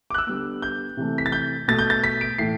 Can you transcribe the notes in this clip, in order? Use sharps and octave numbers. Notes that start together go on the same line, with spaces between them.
D6
F#6
E6
D3 G3 B3
G6
C3 E3 A3
B6
A6
G6
B2 A3 A6
G6
A6
B6
D7
A2 E3 A3 C7